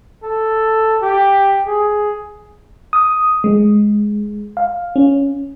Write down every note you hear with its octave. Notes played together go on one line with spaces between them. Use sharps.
A4
G4
G#4
D#6
G#3
F5
C#4